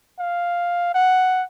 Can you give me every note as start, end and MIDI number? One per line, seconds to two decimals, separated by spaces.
0.19 0.92 77
0.94 1.43 78